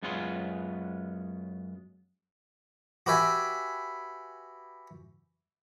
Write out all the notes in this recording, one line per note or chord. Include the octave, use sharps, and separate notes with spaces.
F#2 G#3 B3 C#4 F4 C6
F#4 G4 B4 E5 G5 G#5